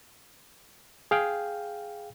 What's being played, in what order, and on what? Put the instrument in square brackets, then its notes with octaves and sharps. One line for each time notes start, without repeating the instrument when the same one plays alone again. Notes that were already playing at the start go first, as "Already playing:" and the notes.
[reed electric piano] G#4 F5 G5